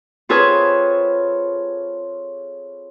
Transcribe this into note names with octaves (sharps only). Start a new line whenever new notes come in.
C4 F4 G#4 A4 B4 C#5